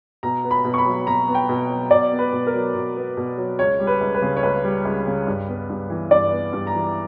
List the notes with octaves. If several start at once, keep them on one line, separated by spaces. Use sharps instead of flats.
B2 A#5
B3
B5
B2
C#6
B5
F#3
B2 A#5
B3
G5
B2
F#3
B2 D5
B3
B4
B2
A#4
F#3
B2
B3
B2
F#3
C#2 C#5
G3
B4
C#2
B4
C#3
C#5
C#2 B4
G3
C#2
C#3
G2
B3
G2
E3
G2 D5
B3
G2
A#5
E3